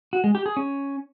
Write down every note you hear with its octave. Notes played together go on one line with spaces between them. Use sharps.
F#4
G#3
G4
G#4
C#4